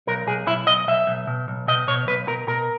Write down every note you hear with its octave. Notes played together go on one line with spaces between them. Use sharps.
B1 A#4
B1 G#4
B1 E4
B1 D#5
B1 E5
B1
B2
B1
B2 D#5
B2 C#5
B1 B4
B2 A#4
B2 A#4